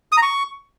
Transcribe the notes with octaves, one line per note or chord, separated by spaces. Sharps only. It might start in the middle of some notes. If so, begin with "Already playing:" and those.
D#6
A#5
C#6